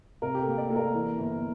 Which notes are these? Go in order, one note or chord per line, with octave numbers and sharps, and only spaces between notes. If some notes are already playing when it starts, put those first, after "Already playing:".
C3 A#4
G4
A4
A#3
D5
A#3 A4
A#4
E3
G1